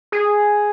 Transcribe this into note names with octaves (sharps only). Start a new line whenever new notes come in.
G#4